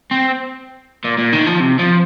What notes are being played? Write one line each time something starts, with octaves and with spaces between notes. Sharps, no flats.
C4
A#2
A#2
D#3
F3
C3
F3